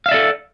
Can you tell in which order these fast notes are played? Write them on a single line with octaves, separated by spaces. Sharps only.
F5 E5 D5 A4